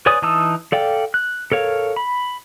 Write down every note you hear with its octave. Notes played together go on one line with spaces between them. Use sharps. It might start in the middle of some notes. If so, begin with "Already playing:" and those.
B4 C#5 D5 G#5 D#6
E3 D#4 A5 D#6 E6
A4 D5 F5 G5
F#6
A4 A#4 C#5 F5
B5